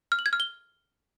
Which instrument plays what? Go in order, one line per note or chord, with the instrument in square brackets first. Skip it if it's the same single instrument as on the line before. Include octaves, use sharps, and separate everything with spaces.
[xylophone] F6
F#7
G#6
F6
G7